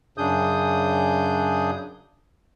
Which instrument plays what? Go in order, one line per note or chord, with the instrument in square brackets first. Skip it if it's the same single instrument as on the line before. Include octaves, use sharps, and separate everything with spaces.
[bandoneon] F#2 C#3 D4 G#4 D#6 G6